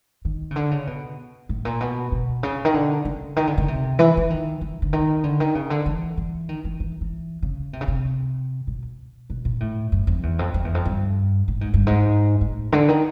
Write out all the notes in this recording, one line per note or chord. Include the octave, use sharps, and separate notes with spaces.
D#3
C#3
D3
C#3
B2
A2
A#2
B2
B2
C#3
D#3
D3
C#3
D#3
D3
C#3
C3
E3
E3
D#3
E3
D3
D#3
D3
D#3
C#3
D3
E3
E3
D#3
E3
E3
E3
C#3
C3
C#3
C3
B2
B2
A#2
A2
F#2
F2
E2
F2
F2
E2
F2
G2
A2
G#2
G2
G#2
A2
D3
D#3